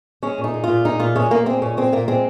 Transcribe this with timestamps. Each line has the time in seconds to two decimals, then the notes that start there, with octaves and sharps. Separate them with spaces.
0.23 G#3 C#4
0.38 A#2
0.44 D#4
0.54 G#3
0.64 F4
0.69 A#2
0.85 G#3 D#4
1.00 A#2 F4
1.16 G#3 C#4
1.31 A#2 A#3
1.46 G#3 C4
1.62 A#2 C#4
1.77 G#3 C4
1.92 A#2 A#3
2.08 G#3 C4